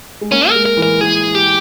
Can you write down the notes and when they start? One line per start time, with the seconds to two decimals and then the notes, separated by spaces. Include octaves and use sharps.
0.21 G#3
0.32 A#3 C#4
0.49 A#4
0.55 G#3
0.66 A#4
0.77 E3
0.83 A#4
1.01 E3 G#4
1.35 G4